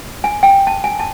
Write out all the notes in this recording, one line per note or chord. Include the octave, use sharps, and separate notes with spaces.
G#5
G5
A5
G#5
A5